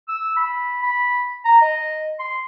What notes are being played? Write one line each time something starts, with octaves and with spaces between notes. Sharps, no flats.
E6
B5
B5
A#5
D#5
C6